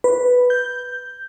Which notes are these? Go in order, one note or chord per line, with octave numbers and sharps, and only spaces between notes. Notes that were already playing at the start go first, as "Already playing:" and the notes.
B4
G6